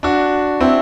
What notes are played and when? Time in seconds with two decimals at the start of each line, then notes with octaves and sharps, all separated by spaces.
0.03 D4 F#4
0.61 C4 E4